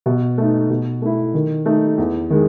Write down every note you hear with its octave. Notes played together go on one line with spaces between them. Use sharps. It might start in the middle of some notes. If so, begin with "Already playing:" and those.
B2
A3 D#4
B2
A3 E4
D#3
A3 D#4
E2
D#3 G#3